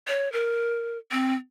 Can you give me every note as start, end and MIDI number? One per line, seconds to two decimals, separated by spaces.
0.08 0.31 73
0.32 0.98 70
1.11 1.34 60